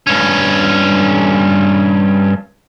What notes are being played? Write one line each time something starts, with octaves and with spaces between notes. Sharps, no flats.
G2 C#4